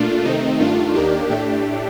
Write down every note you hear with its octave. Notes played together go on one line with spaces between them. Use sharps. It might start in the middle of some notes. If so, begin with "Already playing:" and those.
Already playing: A#2 A3 D4 F4
C3 D#3 A3 C4 D#4
G2 D#3 A3 D4 F4
D#2 D#3 A#3 D4 G4
A2 A3 D4 G4